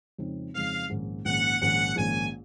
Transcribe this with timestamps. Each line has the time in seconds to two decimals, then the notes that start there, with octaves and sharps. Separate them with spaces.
0.18 F2 C#3 G#3 C4 D#4
0.54 F2 C#3 G#3 C4 D#4 F5
0.90 A#1 G#2 D#3 A#3 C#4
1.25 A#1 G#2 D#3 A#3 C#4 F#5
1.61 A#1 G#2 D#3 A#3 C#4 F#5
1.96 A#1 G#2 D#3 A#3 C#4 G#5